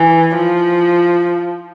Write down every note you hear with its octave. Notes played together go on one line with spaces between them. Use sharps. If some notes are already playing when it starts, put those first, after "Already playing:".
Already playing: E3
F3